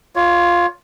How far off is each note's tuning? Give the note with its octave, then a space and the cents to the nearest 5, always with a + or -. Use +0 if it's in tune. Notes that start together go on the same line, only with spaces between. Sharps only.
F4 +0 C#5 +25